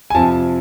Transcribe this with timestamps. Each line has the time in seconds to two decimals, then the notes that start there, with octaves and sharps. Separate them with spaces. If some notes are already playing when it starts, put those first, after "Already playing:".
0.10 G#5
0.15 F2 C3 F3 A5